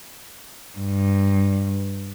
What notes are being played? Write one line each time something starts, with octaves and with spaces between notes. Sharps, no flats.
G2